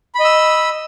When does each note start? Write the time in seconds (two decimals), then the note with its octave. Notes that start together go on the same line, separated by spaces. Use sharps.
0.15 B5
0.20 D#5
0.25 E6